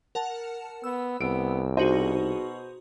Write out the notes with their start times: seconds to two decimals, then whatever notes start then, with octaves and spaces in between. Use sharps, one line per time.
0.15 A#4 F#5 A5
0.84 B3 E6
1.21 C2 B3 D7
1.77 B2 D#4 F#4 G#4 C5